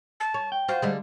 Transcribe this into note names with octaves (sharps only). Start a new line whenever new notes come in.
A5
C#5
G5
F4 F#4 C5
D3 G3 G#3